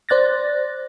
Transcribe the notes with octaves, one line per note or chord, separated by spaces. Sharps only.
C5 D5 F#6 A6 A#6